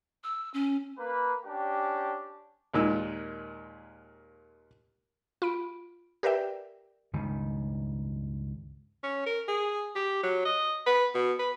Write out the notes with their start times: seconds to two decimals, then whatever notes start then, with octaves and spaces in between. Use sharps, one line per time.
0.24 E6
0.54 C#4
0.98 A#3 B4
1.46 C#4 D4 G4
2.74 D#2 A#2 G#3 E6
5.42 F4 B5 D7
6.23 G4 A#4 B4 D5 E5 G5
7.13 C#2 G2 D#3
9.03 C#4
9.26 A#4
9.48 G#4
9.96 G4
10.23 F#3
10.45 D#5
10.86 B4
11.15 B2
11.39 B4